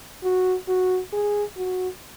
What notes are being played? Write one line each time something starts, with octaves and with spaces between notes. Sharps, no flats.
F#4
F#4
G#4
F#4